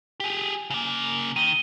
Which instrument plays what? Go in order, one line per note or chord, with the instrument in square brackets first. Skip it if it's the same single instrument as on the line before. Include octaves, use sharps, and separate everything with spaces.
[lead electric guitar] G4 G#4
C#3 A#3
[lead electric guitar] D#3 [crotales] D#7 G7